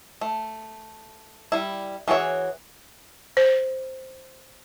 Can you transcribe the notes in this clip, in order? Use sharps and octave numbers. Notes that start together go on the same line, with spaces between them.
A3
G3 E4
E3 F#4 G#4 C#5 E5
C5